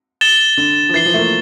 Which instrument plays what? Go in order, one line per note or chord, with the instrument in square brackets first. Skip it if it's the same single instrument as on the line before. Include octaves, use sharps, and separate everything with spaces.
[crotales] A6 E7 G7
[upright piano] D3
F3
[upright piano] E3 [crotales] A6 C7 G7
[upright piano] F3
A3
A#3